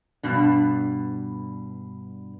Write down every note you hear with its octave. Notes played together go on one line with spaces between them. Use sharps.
G2 B2 D4